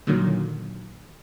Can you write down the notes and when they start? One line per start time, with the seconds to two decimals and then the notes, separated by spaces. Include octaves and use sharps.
0.07 A#2 D3 D#3 F#3